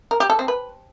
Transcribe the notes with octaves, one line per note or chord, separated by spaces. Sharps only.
A#4
G4
A4
C4
B4